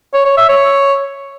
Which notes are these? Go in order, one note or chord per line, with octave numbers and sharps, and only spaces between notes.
C#5
C#5
E5
C#5